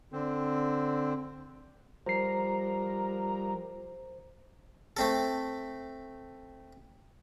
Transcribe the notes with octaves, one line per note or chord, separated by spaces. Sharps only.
D3 C4
F3 G3 A#4 C5 A#5 C7
A3 C4 A4